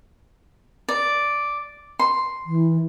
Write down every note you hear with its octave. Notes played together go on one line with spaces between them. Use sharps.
D5
C6
E3